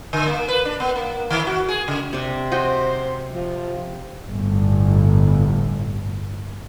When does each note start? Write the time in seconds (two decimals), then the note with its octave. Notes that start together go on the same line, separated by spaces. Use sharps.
0.13 D3
0.27 A#3
0.48 B4
0.65 D4
0.80 B3
0.96 A#3
1.30 D#3
1.47 F#4
1.69 G#4
1.88 C#3
2.13 C3 D4
2.52 F#4 C5 D#5 G5
3.32 F3
4.26 G1 A2